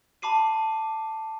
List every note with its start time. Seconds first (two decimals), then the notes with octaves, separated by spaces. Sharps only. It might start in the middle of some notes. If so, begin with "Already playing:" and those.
0.22 A5 B5 D6 C7 D#7